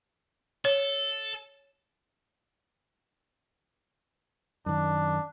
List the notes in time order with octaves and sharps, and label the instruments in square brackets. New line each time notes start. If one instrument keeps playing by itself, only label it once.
[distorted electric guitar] A4 [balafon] C#5
[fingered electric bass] F#2 D#3 [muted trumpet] D4